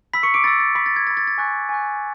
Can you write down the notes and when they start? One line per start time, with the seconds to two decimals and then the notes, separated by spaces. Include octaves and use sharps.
0.14 B5 E6 B6
0.23 C#6 C#7
0.34 D6 D7
0.44 B5 E6 A6
0.60 A6
0.75 B5 E6 B6
0.86 A6
0.96 G#6
1.07 E6 A6
1.10 B5
1.17 A6
1.27 A6
1.38 G#5 C#6 F#6
1.69 G#5 C#6 F#6